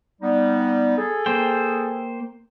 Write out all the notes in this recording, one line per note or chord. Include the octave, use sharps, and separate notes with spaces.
G3 B3 D#4
G#4 A4
A#3 C5 G5